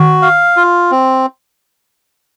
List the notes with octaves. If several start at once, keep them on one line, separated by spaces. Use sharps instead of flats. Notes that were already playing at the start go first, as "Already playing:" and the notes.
Already playing: D#3 F#4
F5
F4
C4